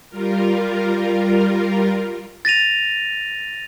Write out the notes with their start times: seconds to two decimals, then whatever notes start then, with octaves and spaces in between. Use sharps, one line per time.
0.10 G3 F4 A#4
2.45 A6 A#6 D#7 F7